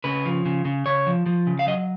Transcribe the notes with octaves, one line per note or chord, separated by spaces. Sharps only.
C#3 B4
F3
C#3
C#3
C#3 C#5
F3
F3
C#3
F5
F#3 D#5